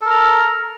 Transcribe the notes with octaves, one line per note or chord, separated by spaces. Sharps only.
A4 A#4 A#5